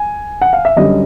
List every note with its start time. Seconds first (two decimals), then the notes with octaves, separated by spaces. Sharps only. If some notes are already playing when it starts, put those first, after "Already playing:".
Already playing: G#5
0.42 F#5
0.53 F5
0.65 E5
0.77 F#2 D3 G3 D#5